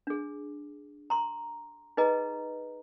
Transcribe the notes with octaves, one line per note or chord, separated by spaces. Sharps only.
D4 G#4
A#5 C6
D#4 G#4 B4 D#5 A#5